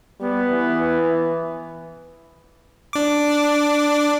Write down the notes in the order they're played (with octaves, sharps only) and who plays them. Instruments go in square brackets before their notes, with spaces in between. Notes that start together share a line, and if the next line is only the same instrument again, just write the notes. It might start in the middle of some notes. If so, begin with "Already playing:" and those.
[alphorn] G3 [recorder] B3
[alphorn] E3
[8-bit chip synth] D4 D6